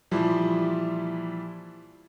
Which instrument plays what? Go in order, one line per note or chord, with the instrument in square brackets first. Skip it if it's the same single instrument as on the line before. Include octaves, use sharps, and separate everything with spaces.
[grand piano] A#2 E3 F3 G3 E4